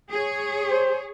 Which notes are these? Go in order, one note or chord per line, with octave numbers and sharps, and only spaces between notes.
G#4 C#5
C5